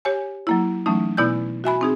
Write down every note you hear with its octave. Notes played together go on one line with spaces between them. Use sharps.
G4 C#5 G#5
F#3 A#3 E4
E3 F#3 A3 C#4 D#4
B2 B3 E4 D5 G#5 G6
F#4 E5 G#5 B5
C4 D#4 G#4